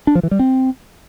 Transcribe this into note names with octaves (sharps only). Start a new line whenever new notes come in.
D4
F3
E3
G3
C4